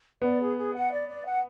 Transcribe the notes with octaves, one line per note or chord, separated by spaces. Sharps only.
B3 D5
G#4
G#4
F#5
D5
D5
F#5